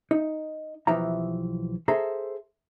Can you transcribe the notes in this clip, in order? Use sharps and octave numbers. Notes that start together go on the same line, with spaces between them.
D#4
B1 E3 F3 G4 E5 A#5
G#4 A4 C5 E5 A#5